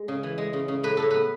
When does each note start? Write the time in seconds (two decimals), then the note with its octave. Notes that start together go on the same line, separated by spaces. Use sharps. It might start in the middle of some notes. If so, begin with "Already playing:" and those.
Already playing: G#3
0.08 C#3
0.23 E3
0.38 G#3
0.53 C#3
0.68 C#3
0.83 A2 B4
0.97 A2 A4
1.11 B3 B4